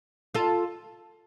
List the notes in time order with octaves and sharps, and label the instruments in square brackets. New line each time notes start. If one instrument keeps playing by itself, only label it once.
[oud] F4 A4